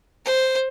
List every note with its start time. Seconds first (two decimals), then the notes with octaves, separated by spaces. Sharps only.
0.25 C5